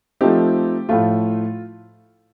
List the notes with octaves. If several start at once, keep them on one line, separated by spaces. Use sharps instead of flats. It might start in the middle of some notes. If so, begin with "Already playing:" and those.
F3 A3 C4 D#4 G4
A2 F3 A3 F4